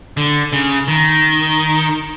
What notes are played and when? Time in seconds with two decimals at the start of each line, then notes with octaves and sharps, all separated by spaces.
0.17 D3
0.53 C#3
0.88 D#3